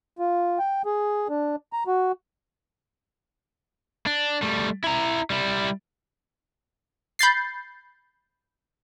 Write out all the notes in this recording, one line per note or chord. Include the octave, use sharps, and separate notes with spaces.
F4
G5
G#4
D4
A#5
F#4
D4
G3 A3
E4 A#5
G3 E4
B5 G6 A6 C7